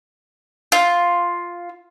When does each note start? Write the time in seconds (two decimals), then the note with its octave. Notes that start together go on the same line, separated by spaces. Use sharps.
0.72 F4